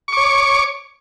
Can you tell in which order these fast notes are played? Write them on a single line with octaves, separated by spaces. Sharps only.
C#6 D6 C#5